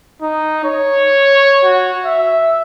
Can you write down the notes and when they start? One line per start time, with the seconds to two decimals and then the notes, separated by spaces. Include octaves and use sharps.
0.22 D#4
0.64 C#5
1.64 F#4
2.05 E5